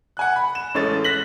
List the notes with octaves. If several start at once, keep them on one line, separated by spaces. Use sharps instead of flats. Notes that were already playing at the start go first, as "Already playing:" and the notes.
F#5 G#5 F#6
B5
E7
A1 G#3 C#4 A4 A6
F#6 A#6 B6 F#7